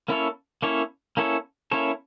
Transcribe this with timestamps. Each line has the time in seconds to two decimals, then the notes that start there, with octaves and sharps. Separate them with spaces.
0.08 A#3 C#4 E4 A4 C#5
0.62 A#3 C#4 E4 A4 C#5
1.17 A#3 C#4 E4 A4 C#5
1.71 A#3 C#4 E4 A4 C#5